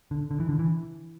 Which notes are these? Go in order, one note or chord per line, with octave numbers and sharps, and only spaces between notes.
D3
D3
E3
D3
E3